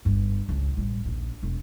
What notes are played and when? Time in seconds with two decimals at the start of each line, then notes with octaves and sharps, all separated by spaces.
0.05 G1 G2
0.49 C#2
0.77 A1 G3
1.05 A#1 D#2
1.43 E1